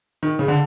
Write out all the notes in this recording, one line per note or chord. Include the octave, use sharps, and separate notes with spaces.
D#3
C#3
D3